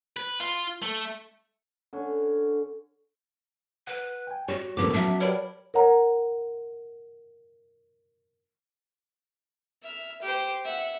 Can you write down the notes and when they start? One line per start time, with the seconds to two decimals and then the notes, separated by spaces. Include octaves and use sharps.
0.17 B4
0.40 F4
0.82 A3
1.93 D3 C#4
3.87 B4 F#5
4.27 G5 G#5
4.48 G3 F#4 C#5
4.77 D#2 A2 F3 A3 B3 C#4 G4 D6
4.93 F#3 E5 A5
5.20 G4 A#4 B4 C#5 D5 B5
5.74 A#4 C#5 F#5 A#5
9.83 E5 F6
10.22 G4 C5
10.64 E5 F#5